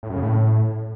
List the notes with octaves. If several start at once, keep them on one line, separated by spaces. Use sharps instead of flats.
A2
F#2
C#3
A2